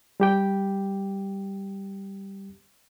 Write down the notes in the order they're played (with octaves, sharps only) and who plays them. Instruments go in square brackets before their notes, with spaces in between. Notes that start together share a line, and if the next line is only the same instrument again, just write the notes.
[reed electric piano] G3 G4 G5